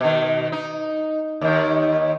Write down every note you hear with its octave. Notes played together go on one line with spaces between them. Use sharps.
B2 D#3
D#4
D#2 D#3